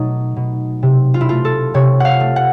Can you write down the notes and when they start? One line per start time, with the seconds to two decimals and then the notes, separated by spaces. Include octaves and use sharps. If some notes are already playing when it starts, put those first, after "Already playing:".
Already playing: B2 F#3 A3 D#4
0.36 B2
0.83 C3
1.14 F4
1.21 E4
1.29 A3 F4
1.45 A4
1.74 C3 C#5
2.00 F5 F#5
2.20 A3
2.36 F#5